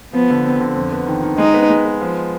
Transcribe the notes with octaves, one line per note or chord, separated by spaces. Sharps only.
F3 B3
D3
C4
D3
F2
B3
D#3
D#3
G#3 D#4
B3
G#3
B3
F3